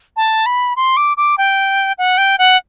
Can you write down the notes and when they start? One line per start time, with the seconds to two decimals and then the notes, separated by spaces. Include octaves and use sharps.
0.16 A5
0.46 B5
0.76 C6
0.97 D6
1.17 D6
1.38 G5
1.98 F#5
2.18 G5
2.39 F#5